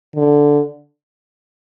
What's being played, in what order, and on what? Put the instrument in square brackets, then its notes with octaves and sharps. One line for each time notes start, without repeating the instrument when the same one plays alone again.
[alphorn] D3